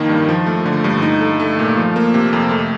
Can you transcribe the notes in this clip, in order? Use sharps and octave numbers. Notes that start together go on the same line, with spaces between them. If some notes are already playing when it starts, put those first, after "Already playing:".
Already playing: F2 D#3 A#3 D#4
G2
F3
A3
D3
G2
D#4
A4
A3
A#2
F3
A#3
C3
F2
A3